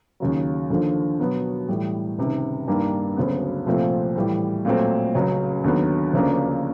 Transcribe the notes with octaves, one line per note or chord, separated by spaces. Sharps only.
D#2 C#3 F#3
D#2 D3 F3
B2 F#3 B3
A2 E3 G3
C#2 C3 D#3
G2 D#3 G3 A#3 D4
D2 C#3 F#3 B3
C2 A#2 F3 A3 C4
A2 E3 G3
A#2 F#3 A3 C4
C#2 C#3 F#3
D#2 D3 F#3 B3
D2 C#3 F3 A#3 D4